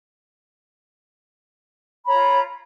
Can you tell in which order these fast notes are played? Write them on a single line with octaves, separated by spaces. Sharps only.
B5 C#5 A#5 F4